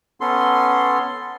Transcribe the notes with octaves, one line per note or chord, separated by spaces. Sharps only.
B3 C#4 A4 C6